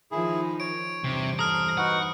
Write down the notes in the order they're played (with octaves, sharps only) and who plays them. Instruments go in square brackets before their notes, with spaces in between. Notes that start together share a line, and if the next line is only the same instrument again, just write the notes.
[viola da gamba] D#3 F3 D#4 [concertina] E4 G#4
[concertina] C#5 [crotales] D7
[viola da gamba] E2 G2 C5 [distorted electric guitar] C3
[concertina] A4 [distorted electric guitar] A#5 [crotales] D#6 F6
[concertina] D#4 F#4 B4 [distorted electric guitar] F#5